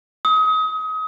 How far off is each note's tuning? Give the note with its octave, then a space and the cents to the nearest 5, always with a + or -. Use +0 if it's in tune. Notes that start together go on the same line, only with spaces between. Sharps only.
D#6 +30